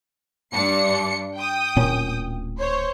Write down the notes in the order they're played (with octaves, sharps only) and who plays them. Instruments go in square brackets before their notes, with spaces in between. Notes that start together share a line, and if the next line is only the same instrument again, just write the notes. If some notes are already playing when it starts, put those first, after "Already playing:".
[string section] G2 D4 C#7
G5 D#6
[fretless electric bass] D1 A#2 C#4
[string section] C5 C#5